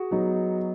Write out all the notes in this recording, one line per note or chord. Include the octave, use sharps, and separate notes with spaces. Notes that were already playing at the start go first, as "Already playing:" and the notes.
Already playing: F#4 G#4
F#3 B3 D#4